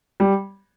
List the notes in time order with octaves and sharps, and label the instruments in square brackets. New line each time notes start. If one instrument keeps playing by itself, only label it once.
[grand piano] G3